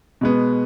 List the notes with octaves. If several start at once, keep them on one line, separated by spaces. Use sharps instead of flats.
B2 G#3 B3